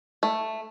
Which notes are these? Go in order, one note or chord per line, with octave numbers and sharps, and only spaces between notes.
A3